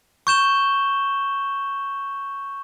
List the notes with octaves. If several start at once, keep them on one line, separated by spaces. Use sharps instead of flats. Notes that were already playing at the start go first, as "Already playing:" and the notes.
C#6 G6 E7 G7